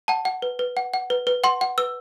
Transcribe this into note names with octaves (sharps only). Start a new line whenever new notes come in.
F#5 A5
F#5
B4
B4
F#5
F#5
B4
B4
F#5 C6
F#5
B4 E6